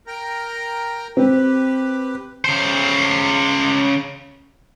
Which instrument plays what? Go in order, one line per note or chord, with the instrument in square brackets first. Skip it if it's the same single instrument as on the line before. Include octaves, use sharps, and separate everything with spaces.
[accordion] A#4 G5 A#5
[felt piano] C4 [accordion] G4 B4
[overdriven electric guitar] C#3 C5